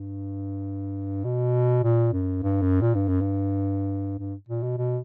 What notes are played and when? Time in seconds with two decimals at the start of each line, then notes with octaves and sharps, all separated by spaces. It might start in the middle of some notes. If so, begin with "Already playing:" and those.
Already playing: G2
1.24 B2
1.83 A#2
2.13 F#2
2.43 G2
2.62 F#2
2.82 A#2
2.95 G2
3.08 F#2
3.21 G2
4.19 G2
4.49 A#2
4.63 B2
4.78 B2